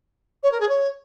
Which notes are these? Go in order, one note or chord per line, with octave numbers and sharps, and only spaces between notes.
C#5
A#4
G#4
C#5